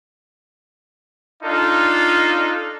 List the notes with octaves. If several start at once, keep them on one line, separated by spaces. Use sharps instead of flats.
D4 D#4 F4 A4